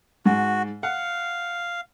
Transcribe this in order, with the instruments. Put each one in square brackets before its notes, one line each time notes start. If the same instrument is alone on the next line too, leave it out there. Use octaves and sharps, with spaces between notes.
[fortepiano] G#2 [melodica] F#4
[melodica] F5 [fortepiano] F#5